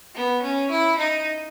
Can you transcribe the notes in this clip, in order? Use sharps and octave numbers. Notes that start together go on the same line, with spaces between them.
B3
C#4
E4
D#4